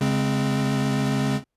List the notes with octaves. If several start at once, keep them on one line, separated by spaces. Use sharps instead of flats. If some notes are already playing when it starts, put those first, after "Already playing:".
C#3 G#3 C4